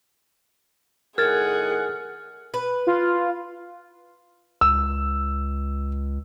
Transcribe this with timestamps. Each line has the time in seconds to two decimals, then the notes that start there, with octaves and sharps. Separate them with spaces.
1.18 A2 D#3 G#4 A#4 F#5 F6 G#6 A6
2.54 B4
2.87 F4
4.61 C#2 E6